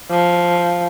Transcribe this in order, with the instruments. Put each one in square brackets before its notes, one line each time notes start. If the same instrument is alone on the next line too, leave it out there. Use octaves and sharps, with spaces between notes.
[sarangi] F3